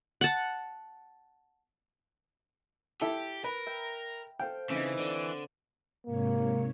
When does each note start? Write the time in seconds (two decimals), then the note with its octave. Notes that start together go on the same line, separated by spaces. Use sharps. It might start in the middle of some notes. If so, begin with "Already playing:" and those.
0.21 F#5 A5
3.01 E4 G4 A4
3.44 A#4 B4
3.66 E5 G5 B5
4.39 A4 C5 F5 G5
4.70 C#3 E3 C4 D#4
4.99 D3 D5
6.07 G#2 C3 A#3 C#5